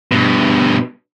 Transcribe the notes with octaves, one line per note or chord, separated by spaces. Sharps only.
G2 B2